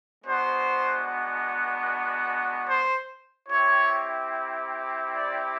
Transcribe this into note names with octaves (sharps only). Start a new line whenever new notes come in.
G#3 B3 D4 F#4 C5
C5
C4 E4 G4 C#5
D5